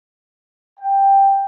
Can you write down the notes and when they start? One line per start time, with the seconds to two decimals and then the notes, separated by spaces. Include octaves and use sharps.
0.80 G5